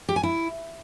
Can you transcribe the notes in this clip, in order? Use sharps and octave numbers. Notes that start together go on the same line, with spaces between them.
G4
G#5
E4